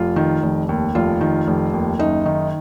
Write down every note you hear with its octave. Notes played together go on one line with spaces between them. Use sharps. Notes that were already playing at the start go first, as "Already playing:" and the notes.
Already playing: F1 F4
D#3
F1
D#2
F1 F4
D#3
F1
D#2
F#1 D#4
D#3